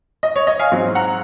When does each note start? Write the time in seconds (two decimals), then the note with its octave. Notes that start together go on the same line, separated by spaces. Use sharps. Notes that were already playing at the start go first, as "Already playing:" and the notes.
0.23 D#5
0.36 C#5
0.47 D#5
0.59 F5 G#5
0.72 G#2 F#3 C4
0.95 F#5 A#5